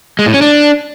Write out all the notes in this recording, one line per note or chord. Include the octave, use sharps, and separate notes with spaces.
G#3
A2
C#4
D4